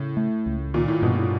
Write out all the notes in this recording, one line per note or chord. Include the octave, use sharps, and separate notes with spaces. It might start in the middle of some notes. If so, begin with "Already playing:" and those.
Already playing: A2 C#3
A3
C#2
A#2 D#3
A2
G2 B2
A2